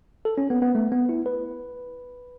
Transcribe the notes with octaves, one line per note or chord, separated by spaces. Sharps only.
A4
C#4
B3
B3
A3
B3
E4
B4